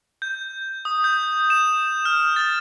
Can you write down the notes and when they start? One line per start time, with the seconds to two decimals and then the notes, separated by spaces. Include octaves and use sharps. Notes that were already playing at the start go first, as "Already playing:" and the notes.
0.22 G6
0.85 D#6
1.04 G6
1.50 E7
2.05 F6
2.36 A6